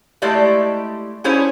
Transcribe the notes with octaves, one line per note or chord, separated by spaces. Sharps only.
G#3 A3 E4 G4 D5 E5
C#4 E4 G#4 C5 C#5